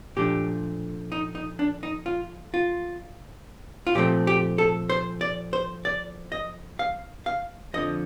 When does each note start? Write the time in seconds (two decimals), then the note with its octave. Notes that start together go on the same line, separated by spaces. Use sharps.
0.16 A#2 F3 A3 D4 G4
1.12 D#4
1.35 D#4
1.59 D4
1.83 D#4
2.06 F4
2.54 F4
3.87 F4
3.95 A#2 F3 A3 C4 G4
4.27 G4
4.58 A4
4.90 C5
5.21 D5
5.53 C5
5.85 D5
6.32 D#5
6.79 F5
7.26 F5
7.74 F2 D3 F3 D#5